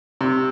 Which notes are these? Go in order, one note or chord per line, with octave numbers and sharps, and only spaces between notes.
C3